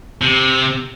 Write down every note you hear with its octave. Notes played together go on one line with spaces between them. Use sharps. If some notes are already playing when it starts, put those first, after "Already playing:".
C3